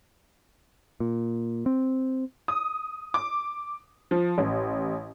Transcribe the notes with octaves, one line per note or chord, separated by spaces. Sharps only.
A#2
C4
D#6
D6
F3
A1